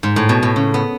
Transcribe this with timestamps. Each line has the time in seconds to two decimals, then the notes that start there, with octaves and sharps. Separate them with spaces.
0.03 G#2
0.16 A2
0.29 B2
0.43 A2
0.56 C#3
0.74 B3